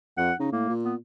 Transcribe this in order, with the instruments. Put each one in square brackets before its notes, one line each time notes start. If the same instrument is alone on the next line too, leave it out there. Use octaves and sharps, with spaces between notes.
[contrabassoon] F2 [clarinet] F#5
[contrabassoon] C#3 [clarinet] D#4
[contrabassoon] A2 [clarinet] A#3
[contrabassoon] A#2
[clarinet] B3